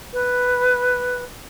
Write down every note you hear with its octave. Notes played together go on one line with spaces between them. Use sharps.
B4